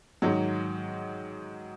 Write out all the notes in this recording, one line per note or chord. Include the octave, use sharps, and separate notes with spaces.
G#2 D#3 F#3